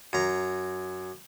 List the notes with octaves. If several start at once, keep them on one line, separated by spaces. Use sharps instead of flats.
F#2 A#5